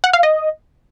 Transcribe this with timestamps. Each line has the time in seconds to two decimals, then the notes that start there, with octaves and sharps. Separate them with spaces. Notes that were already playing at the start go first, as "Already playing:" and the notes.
0.04 F#5
0.13 F5
0.23 D#5